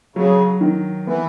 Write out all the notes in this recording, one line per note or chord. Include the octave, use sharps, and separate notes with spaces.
C#3 F#3
D#3
E3 B3